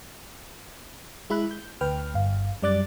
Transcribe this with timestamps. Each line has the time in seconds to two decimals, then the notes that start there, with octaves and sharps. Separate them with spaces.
1.30 G#3 E4 E5 B5 F#6
1.51 G6
1.81 D2 B4 G5 F6
2.14 G1 F5
2.62 F#2 G3 D5 D6 F#6 A6